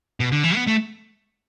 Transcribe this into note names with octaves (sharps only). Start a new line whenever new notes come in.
B2
D3
E3
B3
A3